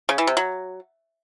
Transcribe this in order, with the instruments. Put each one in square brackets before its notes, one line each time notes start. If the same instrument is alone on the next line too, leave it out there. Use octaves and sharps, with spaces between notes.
[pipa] C#3
E3
C3
F#3